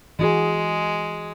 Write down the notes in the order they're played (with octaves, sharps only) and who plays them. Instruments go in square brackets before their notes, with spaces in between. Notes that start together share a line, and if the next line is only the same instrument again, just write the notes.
[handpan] E3 F#4 G#4 [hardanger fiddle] G#3